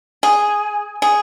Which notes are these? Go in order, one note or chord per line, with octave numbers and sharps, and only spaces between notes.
G#4
G#4